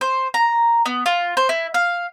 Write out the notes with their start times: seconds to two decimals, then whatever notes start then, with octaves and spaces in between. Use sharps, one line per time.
0.01 C5
0.34 A#5
0.86 B3
1.06 F4
1.37 C5
1.49 E4
1.74 F5